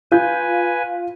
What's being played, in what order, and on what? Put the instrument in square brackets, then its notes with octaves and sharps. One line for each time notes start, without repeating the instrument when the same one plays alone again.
[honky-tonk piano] F4 F5 G6 [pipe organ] B4 G#5